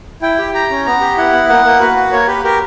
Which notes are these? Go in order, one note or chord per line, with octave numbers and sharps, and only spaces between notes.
E4 G5
G4
G4 A#5
C#4
B3 A#5
G4
E4 F#5
B3
A#3 F#5
A#3
F#4 B4
F#4
A#3 C#5
G4 B4
G4 A#4